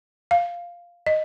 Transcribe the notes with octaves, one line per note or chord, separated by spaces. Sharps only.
F5
D#5